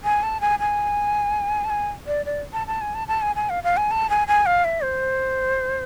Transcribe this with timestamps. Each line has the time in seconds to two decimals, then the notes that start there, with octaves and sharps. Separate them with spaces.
0.04 G#5
0.23 A5
0.41 G#5
0.59 G#5
1.64 A5
1.70 G#5
2.07 D5
2.26 D5
2.53 A5
2.67 A5
2.81 G#5
2.94 A5
3.08 A5
3.22 G#5
3.36 G#5
3.50 F5
3.64 F5
3.77 G#5
3.91 A5
4.10 G#5
4.28 G#5
4.46 F5
4.64 E5
4.83 C5